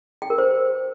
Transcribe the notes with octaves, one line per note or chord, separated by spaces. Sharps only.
G5
A#4
C5